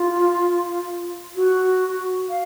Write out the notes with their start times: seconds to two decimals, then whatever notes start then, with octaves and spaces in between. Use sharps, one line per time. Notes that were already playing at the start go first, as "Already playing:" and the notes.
Already playing: F4
1.36 F#4
2.30 F5